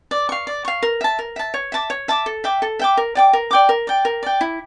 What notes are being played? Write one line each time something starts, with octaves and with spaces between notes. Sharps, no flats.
D5
F5 C#6
D5
F5 C#6
A#4
E5 A5
A#4
E5 A5
C#5
E5 A5 D6
C#5
E5 A5 D6
A4
E5 G5 D6
A4
E5 G5 D6
A#4
D5 G5 D6
A#4
D5 G5 D6
A#4
D5 G5
A#4
D5 G5
E4